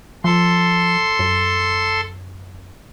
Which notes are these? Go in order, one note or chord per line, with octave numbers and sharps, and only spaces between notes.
F3 A4 C6
F#2